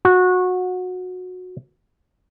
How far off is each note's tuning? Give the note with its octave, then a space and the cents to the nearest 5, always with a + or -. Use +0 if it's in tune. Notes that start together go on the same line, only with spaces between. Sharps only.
F#4 -20